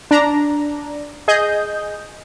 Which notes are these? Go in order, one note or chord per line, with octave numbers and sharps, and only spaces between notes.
D4 A#5
G#4 D#5 G6